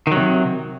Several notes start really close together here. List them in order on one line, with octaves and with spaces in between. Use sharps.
D#3 F#3 C3